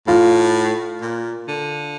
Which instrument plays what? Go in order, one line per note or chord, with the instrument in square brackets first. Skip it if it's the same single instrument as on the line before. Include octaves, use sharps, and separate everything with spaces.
[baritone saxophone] A2 [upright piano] F4
[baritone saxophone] A#2
D3